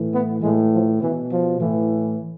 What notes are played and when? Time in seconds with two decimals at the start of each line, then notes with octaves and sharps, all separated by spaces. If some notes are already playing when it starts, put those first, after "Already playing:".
Already playing: A2 E3
0.12 B3
0.41 A2 E3 G#3
0.72 F3
1.01 B2 E3
1.31 F3
1.60 A2 E3